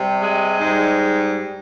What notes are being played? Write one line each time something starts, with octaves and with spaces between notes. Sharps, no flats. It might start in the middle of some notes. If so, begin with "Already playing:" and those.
Already playing: C3 G3
G#3
G#2 G3